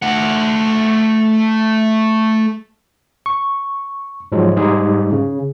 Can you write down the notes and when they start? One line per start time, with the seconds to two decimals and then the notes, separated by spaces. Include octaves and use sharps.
0.02 A3 F#5
3.26 C#6
4.32 G#2 F3 F#3 G#3
4.57 G#2 G3 G#3 D#4 G4 G#4
5.12 C#3